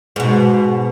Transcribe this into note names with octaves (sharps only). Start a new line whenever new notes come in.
G#2 B2